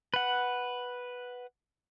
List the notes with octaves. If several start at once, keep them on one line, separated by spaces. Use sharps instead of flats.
B4 F#5